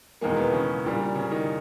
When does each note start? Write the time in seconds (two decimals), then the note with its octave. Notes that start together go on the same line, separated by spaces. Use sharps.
0.21 E1 E2 D#3 G#3 A#3
0.37 B3
0.52 C#3 C#4
0.85 A#1 A#2 G3
1.16 C#3 C#4
1.31 D#3 D#4